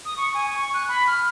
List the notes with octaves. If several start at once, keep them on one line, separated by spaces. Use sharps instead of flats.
D#6
C#6
G#5
C#6
F#6
B5
F6